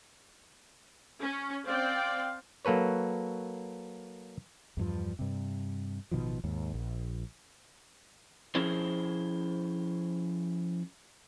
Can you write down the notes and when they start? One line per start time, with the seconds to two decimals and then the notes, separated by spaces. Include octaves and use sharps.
1.22 C#4
1.67 C4 D5 F5 G5
2.65 F#3 A#3 A4 B4 C#5
4.77 E2 G2 F3
5.19 G2 C3
6.11 A1 B2 D#3 F3
6.44 D#2 G#2
6.74 A#1
8.55 F3 C#4 E4 G#4 C5